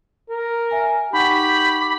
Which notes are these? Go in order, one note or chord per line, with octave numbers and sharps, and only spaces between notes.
A#4
E5 G#5
D#4 G4 F#5 B5 C#6
D6